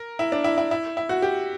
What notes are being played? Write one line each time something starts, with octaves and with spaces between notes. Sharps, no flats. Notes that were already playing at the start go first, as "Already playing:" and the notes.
Already playing: A#4
E4
D4
E4
E4
E4
E4
F#4
G4